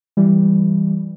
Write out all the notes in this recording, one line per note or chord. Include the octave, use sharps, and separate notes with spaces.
E3 G3